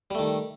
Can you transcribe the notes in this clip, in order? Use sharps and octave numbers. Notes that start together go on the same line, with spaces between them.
D#3 G3 A3